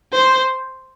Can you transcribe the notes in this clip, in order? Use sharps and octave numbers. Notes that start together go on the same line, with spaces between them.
C5